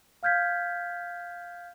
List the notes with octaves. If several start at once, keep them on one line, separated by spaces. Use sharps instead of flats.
F5 F6 G6 G#6 B6